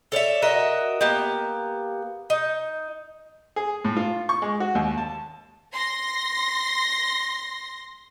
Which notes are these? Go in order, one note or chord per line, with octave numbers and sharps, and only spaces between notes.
A4 C#5 D5 E5
F#4 A#4 D#5 E5
A#3 B3 G4
D#4
G#4
A2
F4
C#6
G#3
F#4
D#2
A5
C6 A#6